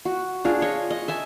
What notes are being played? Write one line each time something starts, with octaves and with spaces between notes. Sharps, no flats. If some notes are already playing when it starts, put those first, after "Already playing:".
F#4
D4 F4 G#4
C#5 D#5
D#5
E5 G#5 A5